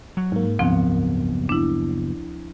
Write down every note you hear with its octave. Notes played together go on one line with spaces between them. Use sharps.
F#3
G#2 A#3
F#1 D2 F3 B3 C4
D4 E4